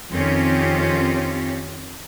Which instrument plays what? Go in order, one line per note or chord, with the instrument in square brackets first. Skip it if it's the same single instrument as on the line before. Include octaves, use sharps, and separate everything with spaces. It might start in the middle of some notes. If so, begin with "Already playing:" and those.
[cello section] F2 D#3 C4 C#4 F4 G4